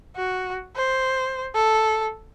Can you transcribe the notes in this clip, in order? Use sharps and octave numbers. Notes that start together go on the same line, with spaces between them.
F#4
C5
A4